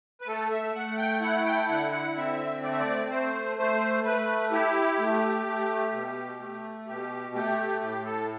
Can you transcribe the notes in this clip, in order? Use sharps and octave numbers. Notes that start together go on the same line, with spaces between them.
B4
A3 A4
E5
A3 F#5
G5
E4 F#5
G5
D3 F#5
F#5
C4 E5
A3 D5
E5
D5
A3 C5
A3 C5
A3 B4
E4 G4
A3
A3
B2
A3
B2 G4
A3 G4
A2 G4
A4